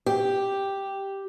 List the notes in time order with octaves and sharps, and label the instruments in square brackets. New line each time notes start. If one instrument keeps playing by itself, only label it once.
[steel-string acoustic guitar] G4